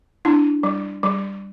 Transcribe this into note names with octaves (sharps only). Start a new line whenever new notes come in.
D4 E4
G3
G3